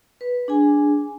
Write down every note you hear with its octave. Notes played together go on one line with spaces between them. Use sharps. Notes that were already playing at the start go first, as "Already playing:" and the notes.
B4
D4 G#4 G#5